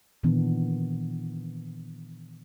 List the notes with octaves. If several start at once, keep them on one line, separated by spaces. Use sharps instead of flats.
A#2 D#3 E3 B3 D4